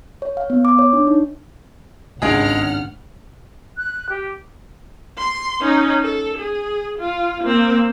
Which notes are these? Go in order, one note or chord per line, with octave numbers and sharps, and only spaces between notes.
C#5
F5
B3
D6
C#5
D4
D#4
G#1 C#2 G2 G#3 G#4 F#5 F6 D7
F#6
G4
C6
C#4 D#4
A4
G#4
F4
A#3 C4